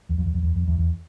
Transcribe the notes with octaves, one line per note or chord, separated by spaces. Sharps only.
E2
F2
E2
F2
E2
F2
E2
E2